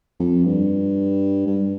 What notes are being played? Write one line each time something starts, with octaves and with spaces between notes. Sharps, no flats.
F2
G2
G2